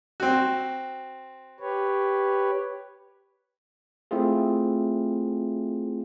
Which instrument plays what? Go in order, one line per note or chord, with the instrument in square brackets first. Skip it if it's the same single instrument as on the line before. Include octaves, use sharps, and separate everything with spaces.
[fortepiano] C4 F#4
[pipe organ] G4 B4 C#5
[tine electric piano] A3 C4 E4 F4 G#4